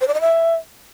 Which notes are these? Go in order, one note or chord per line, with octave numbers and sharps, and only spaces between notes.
C5
D5
D#5
E5